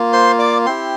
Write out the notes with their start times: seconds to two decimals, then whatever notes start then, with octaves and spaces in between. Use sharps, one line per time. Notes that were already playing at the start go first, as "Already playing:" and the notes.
Already playing: A#3 F4
0.13 C5 C6
0.39 D5 D6
0.66 C4 E4 G4 C5 C6